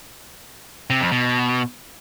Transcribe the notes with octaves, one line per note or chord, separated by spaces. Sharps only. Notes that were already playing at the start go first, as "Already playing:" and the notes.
C3
F2
B2